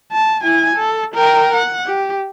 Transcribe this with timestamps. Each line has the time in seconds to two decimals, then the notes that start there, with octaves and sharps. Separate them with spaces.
0.12 A5
0.43 E4 G#5
0.76 A4
1.15 A#4 G5
1.53 F#5
1.86 G4